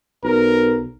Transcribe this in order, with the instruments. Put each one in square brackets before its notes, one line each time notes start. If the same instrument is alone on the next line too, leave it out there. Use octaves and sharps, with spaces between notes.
[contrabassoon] B1 [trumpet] A#4